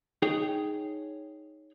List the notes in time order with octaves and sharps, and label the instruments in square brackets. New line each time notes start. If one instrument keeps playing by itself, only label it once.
[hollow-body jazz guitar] D#4 G#4 C#5 G5